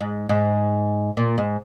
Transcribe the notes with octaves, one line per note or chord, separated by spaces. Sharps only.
G#2
G#2
A#2
G#2